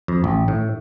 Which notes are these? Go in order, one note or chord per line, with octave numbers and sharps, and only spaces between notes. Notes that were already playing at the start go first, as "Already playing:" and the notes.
F2
A1
A2